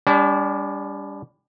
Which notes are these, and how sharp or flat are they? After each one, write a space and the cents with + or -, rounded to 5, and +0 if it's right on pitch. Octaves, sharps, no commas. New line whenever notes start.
G3 +25 D4 -40